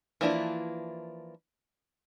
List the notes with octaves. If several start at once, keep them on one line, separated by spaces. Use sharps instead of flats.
E3 F3 A#3 D4 E4